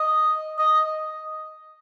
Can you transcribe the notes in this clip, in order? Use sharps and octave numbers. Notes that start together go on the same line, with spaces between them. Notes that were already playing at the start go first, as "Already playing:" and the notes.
Already playing: D#5
D#5